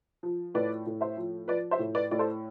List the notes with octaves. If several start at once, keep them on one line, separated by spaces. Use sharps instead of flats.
F3
A2 B4 D5
A2
C5 E5
F3
F3 B4 D5
C5 E5
A2
B4 D5
A2 D5
A4 C5